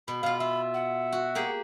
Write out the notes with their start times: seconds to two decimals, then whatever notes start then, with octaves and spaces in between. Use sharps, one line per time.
0.08 B2 B5
0.23 B2 F4 F5
0.40 F4 E5
0.74 F#5
1.12 F#4
1.35 A#3 G4 G#4